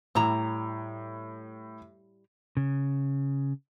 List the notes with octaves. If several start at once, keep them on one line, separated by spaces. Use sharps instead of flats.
A2 G3 E4 A#5
C#3